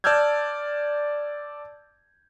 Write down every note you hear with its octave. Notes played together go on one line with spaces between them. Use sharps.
D5 A5 E6 F6 G6 G#6